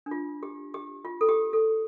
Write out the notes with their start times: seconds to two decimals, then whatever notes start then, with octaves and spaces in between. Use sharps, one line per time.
0.06 D4
0.11 F4
0.43 G4
0.74 G4
1.05 F4
1.21 A4
1.29 G4
1.53 A4